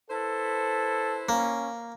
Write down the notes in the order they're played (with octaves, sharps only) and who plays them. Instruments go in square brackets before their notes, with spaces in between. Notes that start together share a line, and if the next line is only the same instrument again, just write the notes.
[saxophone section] E4 B4 C5 [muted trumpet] A4
[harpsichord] A#3 [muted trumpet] C#4